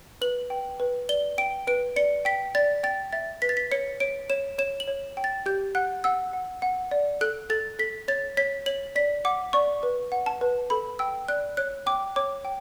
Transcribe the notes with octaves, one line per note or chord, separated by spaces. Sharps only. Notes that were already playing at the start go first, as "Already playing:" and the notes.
B4 F#7
G5
B4
D5 G7
G5 D7
B4 D7
D5 C#7
G5 B6
D5 A6
G5 A6
E5 A6
B4 B6
A6
B6
C#5 C#7
C#5 D7
C#5 E7
C#5 E7
F#7
C#5
G5
A6
G4 G6
F#5 F#6
F#5 E6
F#5
F#5
D5
A4 F#6
A4 A6
A4 B6
C#5 A6
C#5 B6
C#5 F#7
D5 B6
F#5 D6
D5 C#6
B4
F#5
A5
B4
A4 B5
G5 E6
D5 F#6
C#5 F#6
G5 D6
C#5 D6
G5